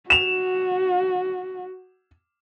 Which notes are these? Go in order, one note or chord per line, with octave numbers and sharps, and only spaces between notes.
F#4 E7 F7